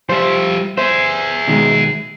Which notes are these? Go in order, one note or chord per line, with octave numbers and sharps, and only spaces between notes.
F3 G3 C5 E5
G#4 C5 E5
B2 D#3 G#3